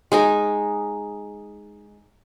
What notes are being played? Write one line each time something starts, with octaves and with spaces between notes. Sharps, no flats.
G#3 D#4 G#5